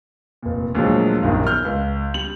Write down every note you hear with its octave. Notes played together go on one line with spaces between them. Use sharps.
F1 A#2
D2 A#2 F3 F#3 G#3
A#1 F#2 B2 D#3 G3
F6 G6
C#2
G3 F#7